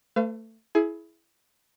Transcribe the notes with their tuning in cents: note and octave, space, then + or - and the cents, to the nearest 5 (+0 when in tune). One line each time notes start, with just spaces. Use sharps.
A3 +20 B4 +45 F5 -30
E4 +5 G#4 +25